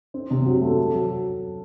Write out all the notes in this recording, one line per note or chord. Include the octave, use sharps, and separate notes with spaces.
C4
C3
F#3
A3
A4
F#3